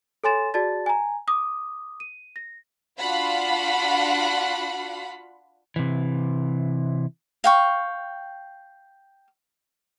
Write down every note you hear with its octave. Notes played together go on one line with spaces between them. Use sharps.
A4 C#5 G#5 C6 A6 E7
F#4 G#4 D5 A5 A6
G#5 A#5
D6 D#6
D#7
A#6
D4 F4 F#4 F5 F#5 B5
C3 E3
F5 G5 C#6